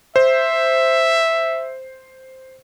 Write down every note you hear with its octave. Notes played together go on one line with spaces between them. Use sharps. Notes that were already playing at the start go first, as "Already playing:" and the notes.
C5 E5